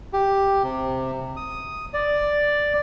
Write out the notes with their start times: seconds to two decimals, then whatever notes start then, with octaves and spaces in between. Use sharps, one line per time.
0.13 G4
0.63 C3
1.37 D#6
1.94 D5